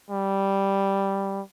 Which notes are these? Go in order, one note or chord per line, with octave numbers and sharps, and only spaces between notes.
G3